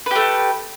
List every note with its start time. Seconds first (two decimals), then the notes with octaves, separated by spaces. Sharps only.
0.06 B4
0.11 G4
0.15 A3